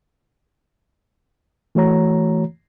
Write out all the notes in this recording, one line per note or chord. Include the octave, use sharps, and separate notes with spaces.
E3 A3 F#4 C#5 A#5